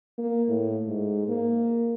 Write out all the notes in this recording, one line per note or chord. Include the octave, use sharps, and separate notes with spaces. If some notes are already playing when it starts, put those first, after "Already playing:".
A#3
A2
G#2
A#3